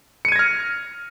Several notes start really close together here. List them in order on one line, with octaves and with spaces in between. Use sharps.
C#7 D#7 G#6 A#6 F6